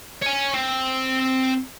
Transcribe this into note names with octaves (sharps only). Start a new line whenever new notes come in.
C#5 G#5
C4